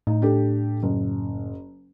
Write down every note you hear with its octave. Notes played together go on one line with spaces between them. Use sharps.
A2 D#4
D4 G4 A4
F#1